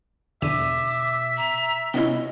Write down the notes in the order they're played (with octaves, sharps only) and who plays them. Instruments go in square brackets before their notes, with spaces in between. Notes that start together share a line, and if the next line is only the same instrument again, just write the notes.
[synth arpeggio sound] E2 D3 D#7 [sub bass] B2 [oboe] E5 [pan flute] D6
[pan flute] A#5
[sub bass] C3 [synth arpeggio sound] B3 C#4 E4 [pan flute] D#5